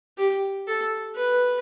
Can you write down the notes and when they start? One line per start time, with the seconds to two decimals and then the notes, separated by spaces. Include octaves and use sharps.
0.18 G4
0.67 A4
1.16 B4